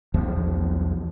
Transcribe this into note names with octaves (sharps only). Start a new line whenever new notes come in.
B1 E2 F3